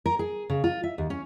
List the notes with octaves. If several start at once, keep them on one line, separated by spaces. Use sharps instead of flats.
A#4
G#4
C#3
F4
E5
D#2
C#4